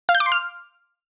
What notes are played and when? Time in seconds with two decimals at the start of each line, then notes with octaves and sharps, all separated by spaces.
0.09 F5
0.15 G6
0.20 D6
0.26 C6
0.32 F6